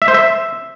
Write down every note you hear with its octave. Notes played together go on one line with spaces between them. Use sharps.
E5
C5
E5